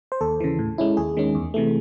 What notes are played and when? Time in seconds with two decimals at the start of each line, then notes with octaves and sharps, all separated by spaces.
0.12 C5
0.21 D#2 A4
0.40 C#3 E3
0.59 A2
0.78 G#3 C#4 E4
0.97 D#2 G#4
1.17 D#3 G#3 C#4
1.35 E2
1.54 C3 E3 A3